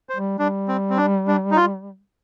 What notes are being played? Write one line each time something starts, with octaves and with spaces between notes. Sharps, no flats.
C5
G3
G3 D4
C4
C4
D4
D4
D#4
F4